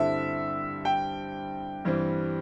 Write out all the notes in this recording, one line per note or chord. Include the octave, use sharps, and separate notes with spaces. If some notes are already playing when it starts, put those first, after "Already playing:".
Already playing: G2 D3 C4 E4 A4 E5
G5
G2 E3 G3 C4